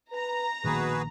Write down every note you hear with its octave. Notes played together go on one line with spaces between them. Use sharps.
B4 A#5
A#1 B2 D#3 A#3 F#4 G#4 B4